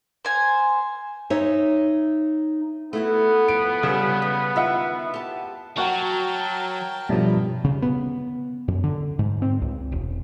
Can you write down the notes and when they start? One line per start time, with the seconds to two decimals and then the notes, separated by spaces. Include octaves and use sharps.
0.25 C5 G#5
1.30 D#4 C#5 E5
2.93 A3 B3 E4 F#4
3.48 F3 D7
3.83 C#3 G3
4.22 G#3
4.56 D#3 F4 E5 F#5
5.14 G4 A5
5.77 F#3 F#4 A#4 F#5 G5 A5 C#6
7.09 G2 B2 F3 F#3 A3 B3
7.64 C#3
7.82 B3
8.68 F#2
8.84 D3
9.19 G#2
9.42 C4
9.62 C#2
9.92 E1